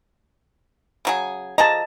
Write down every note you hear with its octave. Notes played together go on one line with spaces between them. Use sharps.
C#3 F#3 G#4
F3 G#4 D#5 A5 A#5